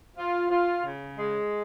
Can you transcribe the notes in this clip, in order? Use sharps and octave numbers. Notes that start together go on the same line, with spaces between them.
F4
F4
C#3
G#3